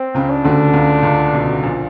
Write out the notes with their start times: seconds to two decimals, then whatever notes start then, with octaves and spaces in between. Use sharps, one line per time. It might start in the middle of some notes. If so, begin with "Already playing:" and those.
Already playing: C4
0.14 C#2 C#3
0.30 D4
0.45 D2 D3
0.73 C#2 C#3
1.03 C#2 C#3
1.33 B1 B2
1.62 A#1 A#2